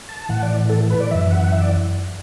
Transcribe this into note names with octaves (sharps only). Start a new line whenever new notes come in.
A5
A2 E3 F#5
D5
A4
B4
D5
F#2 E3 E5
F#5
E5
D5